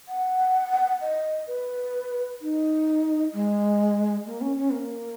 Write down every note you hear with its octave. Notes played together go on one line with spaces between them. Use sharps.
F#5
D#5
B4
D#4
G#3
A#3
C#4
C#4
A#3